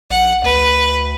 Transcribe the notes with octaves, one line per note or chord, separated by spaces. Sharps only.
A#1 F#5
D2 B4